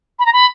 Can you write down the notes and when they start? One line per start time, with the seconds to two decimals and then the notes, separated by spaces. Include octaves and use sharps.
0.19 B5
0.26 A#5
0.33 B5